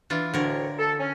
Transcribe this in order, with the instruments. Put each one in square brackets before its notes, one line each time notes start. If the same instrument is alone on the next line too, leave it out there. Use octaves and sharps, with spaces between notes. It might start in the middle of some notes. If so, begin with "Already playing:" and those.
[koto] E3 D4 F4
[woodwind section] D2 A2 C#5 [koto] D3 A#4
[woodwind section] A4
C#4